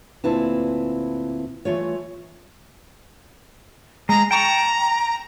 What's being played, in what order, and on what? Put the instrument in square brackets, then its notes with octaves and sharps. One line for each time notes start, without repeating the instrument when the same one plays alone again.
[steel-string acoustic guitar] D2 A#2 C4 E4 B4 A5
E3 A3 F4 C#5
[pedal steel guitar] G#3 [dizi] A#5
[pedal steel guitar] G5 A5 C#6 [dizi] A#5